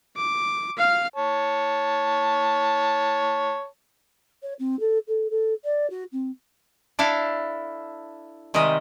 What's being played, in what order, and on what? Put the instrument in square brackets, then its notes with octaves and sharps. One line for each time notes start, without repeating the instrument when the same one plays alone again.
[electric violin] D6
F5 F6
[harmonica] C#5 A5
[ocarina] C#5
C4
A4
A4
A4
D5
F#4
C4
[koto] D4 E4 A4 F5
C3 D#3 G3 G#3 D#5